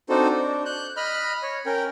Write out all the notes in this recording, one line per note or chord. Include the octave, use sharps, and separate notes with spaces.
C4 D4 D#4 F#4 A4 C5
D4
F#6 G6
D#5 B5 F6 F#6
C#5
C#4 A#4 G5